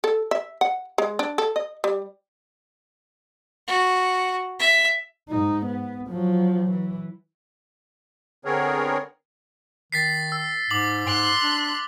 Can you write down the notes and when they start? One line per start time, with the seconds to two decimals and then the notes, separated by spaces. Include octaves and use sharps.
0.04 A4
0.31 E5
0.61 F#5
0.98 G#3
1.19 D4
1.38 A4
1.56 D#5
1.84 G3
3.68 F#4
4.59 E5
5.28 G#2 D#4
5.66 B3
6.09 F3 F#3
6.71 E3
8.45 D3 B3 C4 G#4 A#4 C#5
9.92 D#3 A6 B6 C7
10.32 E6
10.71 G#2 D6 F#7
11.07 G#2 C6 F#6
11.43 D4